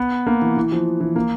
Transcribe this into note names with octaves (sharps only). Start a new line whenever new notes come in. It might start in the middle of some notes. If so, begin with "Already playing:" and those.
Already playing: B3
A#3
E3
E3
F3
E3
A#3